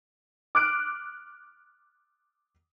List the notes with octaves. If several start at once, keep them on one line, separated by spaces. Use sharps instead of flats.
D6 F6 F#6 D7